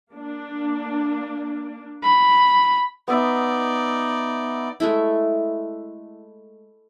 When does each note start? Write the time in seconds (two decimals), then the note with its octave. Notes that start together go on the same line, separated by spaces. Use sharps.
0.13 A#3 D4
2.03 B5
3.08 B3 D#4 D5 E5
4.80 G#3 A3 E4